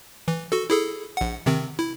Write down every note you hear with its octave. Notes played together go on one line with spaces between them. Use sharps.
E3
F#4 A4
E4 G#4 A4
A#1 F#5
C3 D#3 C4
E4